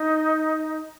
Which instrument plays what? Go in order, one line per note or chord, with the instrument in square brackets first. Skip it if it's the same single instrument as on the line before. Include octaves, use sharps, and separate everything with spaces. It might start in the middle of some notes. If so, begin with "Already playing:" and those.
Already playing: [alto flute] D#4